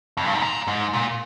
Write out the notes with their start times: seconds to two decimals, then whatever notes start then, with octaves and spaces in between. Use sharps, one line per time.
0.17 F2
0.25 G2
0.33 G#2
0.42 A#2
0.68 G#2
0.93 A#2